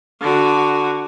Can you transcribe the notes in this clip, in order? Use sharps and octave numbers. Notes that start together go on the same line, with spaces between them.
D3 F#4